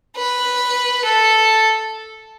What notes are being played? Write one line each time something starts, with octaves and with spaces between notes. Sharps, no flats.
B4
A4